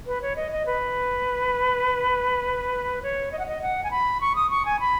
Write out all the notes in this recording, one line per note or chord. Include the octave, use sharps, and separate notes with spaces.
B4
C#5
D#5
D#5
B4
C#5
D#5
F#5
D#5
F#5
G#5
B5
C#6
D#6
C#6
G#5
B5